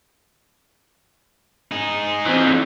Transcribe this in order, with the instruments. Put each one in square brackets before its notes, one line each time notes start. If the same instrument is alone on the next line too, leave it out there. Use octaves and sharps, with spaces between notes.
[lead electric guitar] D#4 G#4
[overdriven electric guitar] E3 C4